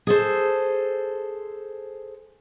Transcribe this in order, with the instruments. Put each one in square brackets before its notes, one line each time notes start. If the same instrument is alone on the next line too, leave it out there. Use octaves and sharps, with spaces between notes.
[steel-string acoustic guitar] G#4 A4 C5